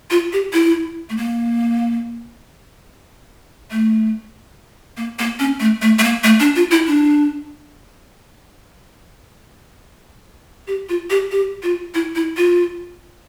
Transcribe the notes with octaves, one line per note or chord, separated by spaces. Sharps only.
F4
G4
E4
A3
A#3
A3
A#3
A#3
C#4
A3
A3
A3
A#3
A3
D4
F4
E4
D4
G4
F4
G4
G4
F4
E4
E4
F4